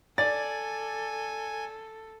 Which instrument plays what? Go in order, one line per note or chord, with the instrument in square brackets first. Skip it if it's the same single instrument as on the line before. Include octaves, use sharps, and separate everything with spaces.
[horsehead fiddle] A4 [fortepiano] D5 [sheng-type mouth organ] G#5 [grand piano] A6